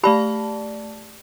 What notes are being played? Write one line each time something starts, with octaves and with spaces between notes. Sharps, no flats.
A3 G4 D5 A5 B5